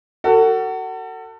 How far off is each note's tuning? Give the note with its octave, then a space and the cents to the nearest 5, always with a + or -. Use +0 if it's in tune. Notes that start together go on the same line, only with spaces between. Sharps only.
F#4 +25 A4 +35